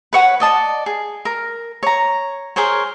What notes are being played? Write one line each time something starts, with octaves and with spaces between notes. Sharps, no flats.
B4 C#5 F#5 B5
D5 D#5 A5
G#4
A#4
C#5 A#5
G#4 A#4 C5 C#5